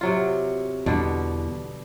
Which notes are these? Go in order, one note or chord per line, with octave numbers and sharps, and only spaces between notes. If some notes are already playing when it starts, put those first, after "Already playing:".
C3 F#3 F4
E2 B2 D3 G3